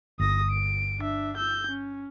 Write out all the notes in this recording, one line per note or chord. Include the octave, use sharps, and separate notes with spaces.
G1 D#6 A#6
D7
D4 E5
E6 G6
C#4